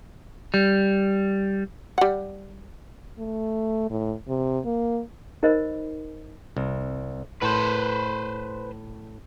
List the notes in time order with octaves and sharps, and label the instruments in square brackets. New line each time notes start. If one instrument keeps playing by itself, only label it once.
[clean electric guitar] G3
[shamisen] G3 F#5
[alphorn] A3
A2
C3
A#3
[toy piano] D#4 A#4 C5 D#5 B5
[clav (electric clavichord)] C2
[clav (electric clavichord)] A2 [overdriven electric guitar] B4 C5